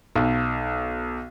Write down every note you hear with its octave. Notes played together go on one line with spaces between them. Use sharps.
B1